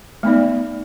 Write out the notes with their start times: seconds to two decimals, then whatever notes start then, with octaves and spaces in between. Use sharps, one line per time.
0.23 A3 B3 D#4 D5